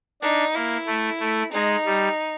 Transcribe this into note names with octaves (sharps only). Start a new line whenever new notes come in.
D4 D#4
A#3 E4
A3
A3
G#3 D#4
G3